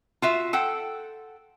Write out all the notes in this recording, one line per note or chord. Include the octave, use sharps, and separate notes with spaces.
F4 F#4 E5
A4 F#5 G5